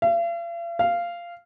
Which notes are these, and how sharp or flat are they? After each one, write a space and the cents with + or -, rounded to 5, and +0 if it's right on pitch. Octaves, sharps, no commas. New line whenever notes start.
F5 -45
F5 -10